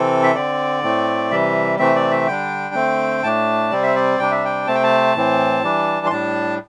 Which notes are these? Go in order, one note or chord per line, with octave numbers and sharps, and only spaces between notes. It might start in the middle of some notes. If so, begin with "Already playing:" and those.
Already playing: C3 E3 C4 A4
E5
D3 C4 D5
A2 A3 C4
C3 E3 G3 E5
C3 E3 A3 C4 E5
D5
E5
D3 G3 D4 G5
D3 A3 C4
A2 A3 D4 A5
C3 G3 C4 D5
E5
D5
C3 G3 D4 G5
E5
G5
C3 A3 C4 A5
G5
A5
A2 E3 C4
E3 G3 D4
C6
A2 G3 D4 A5